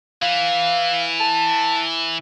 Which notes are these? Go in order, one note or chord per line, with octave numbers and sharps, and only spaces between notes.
E3 F5
A5